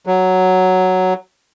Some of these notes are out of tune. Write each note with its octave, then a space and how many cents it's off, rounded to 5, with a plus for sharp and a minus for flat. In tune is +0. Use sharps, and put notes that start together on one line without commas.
F#3 +0